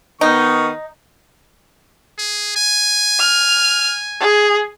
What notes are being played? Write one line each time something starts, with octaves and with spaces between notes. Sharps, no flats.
D#3 B3 D#4 C#6
G#4
G#5
F6
G#4